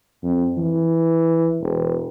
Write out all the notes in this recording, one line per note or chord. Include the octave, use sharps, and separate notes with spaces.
F2
E3
E1